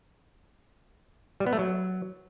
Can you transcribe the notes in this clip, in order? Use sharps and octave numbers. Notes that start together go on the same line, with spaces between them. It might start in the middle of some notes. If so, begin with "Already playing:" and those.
G3
B3
A3
F#3